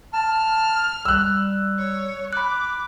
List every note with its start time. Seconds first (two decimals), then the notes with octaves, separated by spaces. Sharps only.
0.14 A5 F6
1.05 G3 E6 F#6
1.78 C#5
2.33 B5 D6 F#6